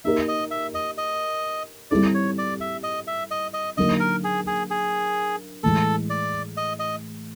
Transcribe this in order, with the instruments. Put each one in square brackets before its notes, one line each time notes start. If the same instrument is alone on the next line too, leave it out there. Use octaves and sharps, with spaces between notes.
[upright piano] A#3 D#4 G4 A#4 [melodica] E5
[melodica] D#5
E5
D#5
D#5
[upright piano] G3 C4 E4 A4 [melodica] D5
[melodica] C#5
D5
E5
D#5
E5
D#5
D#5
[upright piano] D3 F#3 A#3 D#4 [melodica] D#5
[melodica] A#4
G#4
G#4
G#4
[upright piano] A2 E3 G#3 [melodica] A4
[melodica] D5
D#5
D#5